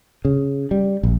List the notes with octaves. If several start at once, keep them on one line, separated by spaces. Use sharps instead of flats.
C#3
G3
A#1